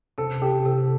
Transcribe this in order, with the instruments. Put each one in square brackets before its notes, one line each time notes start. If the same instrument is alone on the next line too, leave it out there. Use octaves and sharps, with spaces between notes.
[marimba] C3 [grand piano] A4
[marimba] C3 [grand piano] G4
[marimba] C3 [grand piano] A4